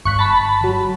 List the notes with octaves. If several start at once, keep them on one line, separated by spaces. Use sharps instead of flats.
G1 C#6 F#6 B6
A5 B5
G1 F#3